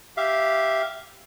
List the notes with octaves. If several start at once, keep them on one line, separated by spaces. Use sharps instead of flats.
G4 E5 F5